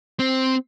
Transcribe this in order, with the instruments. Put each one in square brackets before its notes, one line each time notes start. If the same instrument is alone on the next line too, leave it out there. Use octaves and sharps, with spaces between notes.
[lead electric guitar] C4